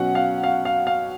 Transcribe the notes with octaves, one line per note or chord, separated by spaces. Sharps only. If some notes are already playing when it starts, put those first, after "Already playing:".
Already playing: B2 F#3 C#4 F#5
F5
F5
F5
F5